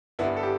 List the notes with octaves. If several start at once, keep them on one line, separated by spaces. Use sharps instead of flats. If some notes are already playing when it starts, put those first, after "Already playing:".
G1 G2 G3 B3 E4
A4
G4